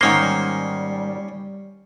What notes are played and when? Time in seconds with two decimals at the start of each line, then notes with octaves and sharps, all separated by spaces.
0.01 G#2 D#3 A#3 C#4 C6
0.18 G3